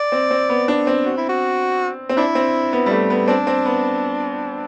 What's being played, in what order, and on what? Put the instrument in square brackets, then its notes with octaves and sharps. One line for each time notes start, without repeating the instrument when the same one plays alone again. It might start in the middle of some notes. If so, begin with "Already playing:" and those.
Already playing: [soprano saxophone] D5
[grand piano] C4
C4
B3
D4
C4
[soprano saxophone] F#4
E4
F#4
[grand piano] C4
[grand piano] D4 [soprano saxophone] E4
[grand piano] C4
B3
G3
A3
B3
[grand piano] C4 [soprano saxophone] D4
[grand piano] C4
B3